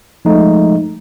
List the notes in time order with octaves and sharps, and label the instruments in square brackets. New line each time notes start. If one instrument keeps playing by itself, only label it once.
[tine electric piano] F3 G#3 A3 D#4